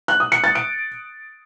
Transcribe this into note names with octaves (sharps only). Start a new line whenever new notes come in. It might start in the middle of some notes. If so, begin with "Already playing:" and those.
F#6
D#6
C#7
A6
D7